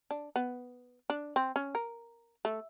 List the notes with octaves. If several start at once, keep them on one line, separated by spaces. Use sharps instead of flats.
D4
B3
D4
C4
C#4
A#4
A3